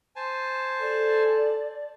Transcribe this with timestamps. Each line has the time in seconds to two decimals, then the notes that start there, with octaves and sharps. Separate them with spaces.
0.16 C5 G#5 A5
0.81 A4 D5